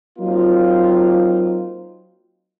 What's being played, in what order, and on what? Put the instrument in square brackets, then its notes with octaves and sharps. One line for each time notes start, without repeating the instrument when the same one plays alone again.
[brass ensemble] F#3 A#3 C4 D#4 F4